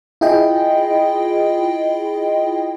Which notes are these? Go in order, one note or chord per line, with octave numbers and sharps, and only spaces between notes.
E4 F4 G#4 D#5 G5